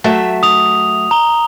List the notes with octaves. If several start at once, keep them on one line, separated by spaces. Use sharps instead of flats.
F#3 A3 E5
D#6 F7
A#5 G7